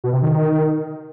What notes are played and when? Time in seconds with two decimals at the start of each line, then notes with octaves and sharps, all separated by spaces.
0.04 B2
0.13 C3
0.22 D#3